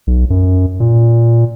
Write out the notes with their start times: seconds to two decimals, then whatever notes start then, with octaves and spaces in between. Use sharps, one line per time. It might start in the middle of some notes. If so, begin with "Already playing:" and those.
0.07 B1
0.30 F#2
0.80 A#2